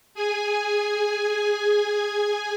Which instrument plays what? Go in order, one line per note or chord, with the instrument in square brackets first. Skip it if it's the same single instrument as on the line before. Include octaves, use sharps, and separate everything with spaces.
[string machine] G#4 G#5